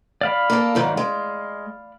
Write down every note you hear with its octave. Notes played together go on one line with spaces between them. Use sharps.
D5 F5 B5
A#3 A4
G#2 D#3 F#3
G#3